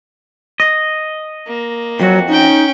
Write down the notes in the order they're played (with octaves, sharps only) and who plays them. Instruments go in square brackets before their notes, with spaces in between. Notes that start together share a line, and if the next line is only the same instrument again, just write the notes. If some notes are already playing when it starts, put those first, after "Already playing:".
[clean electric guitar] D#5
[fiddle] A#3
[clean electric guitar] F2 F#4 [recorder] F#3
[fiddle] C#4 G5 [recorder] D#4